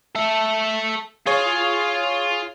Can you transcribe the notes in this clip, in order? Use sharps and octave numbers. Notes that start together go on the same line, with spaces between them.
A4 E5
F4 G#4 C#5